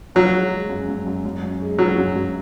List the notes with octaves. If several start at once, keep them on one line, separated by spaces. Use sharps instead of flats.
F3 F#3
G#3
G#3
F#2
F#2
F#2
F#2
F#2
G#3
F#2 F#3
F#2
F#2